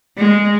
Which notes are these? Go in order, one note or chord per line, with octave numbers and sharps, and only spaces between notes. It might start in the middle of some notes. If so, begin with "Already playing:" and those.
G#3